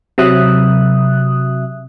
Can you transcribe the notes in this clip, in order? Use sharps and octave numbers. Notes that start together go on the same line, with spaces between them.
C3 F#3 E5 D#6 F#6